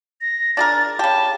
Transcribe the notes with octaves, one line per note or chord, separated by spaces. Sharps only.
A#6
D4 G#4 A#4 A6
C#3 G4 A5